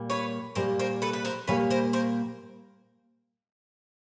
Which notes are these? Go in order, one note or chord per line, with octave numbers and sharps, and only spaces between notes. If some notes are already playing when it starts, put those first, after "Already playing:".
Already playing: A#2 G3 A#3
B4 C#5
A#2 G3 A#3 A#4 C5
A#4 C5
A4 B4
B4
A#4 C5
A#2 G3 A#3 B4 C#5
A#4 C5
A#4 C5